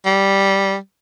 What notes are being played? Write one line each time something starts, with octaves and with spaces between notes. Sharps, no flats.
G3